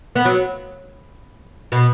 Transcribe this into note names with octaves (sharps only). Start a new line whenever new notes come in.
B3
F#3
B2